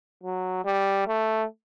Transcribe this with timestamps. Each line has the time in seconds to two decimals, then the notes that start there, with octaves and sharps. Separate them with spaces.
0.24 F#3
0.65 G3
1.07 A3